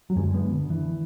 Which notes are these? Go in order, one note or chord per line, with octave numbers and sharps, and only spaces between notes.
F#3
F#2 D3 G#3
B3
D3
E3